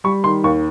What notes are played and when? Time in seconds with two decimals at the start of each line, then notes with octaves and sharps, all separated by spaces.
0.04 G3 C#6
0.24 D#3 C6
0.44 D#2 C#6